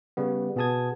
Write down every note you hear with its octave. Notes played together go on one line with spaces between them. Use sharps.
C#3 G3 B3
B2 B3 G#4 A5 D#6 G#6